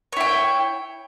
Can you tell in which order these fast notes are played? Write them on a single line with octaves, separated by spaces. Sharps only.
C#5 E4 G5